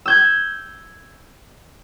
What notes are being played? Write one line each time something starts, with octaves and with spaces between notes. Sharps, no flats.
E6 G6 G#6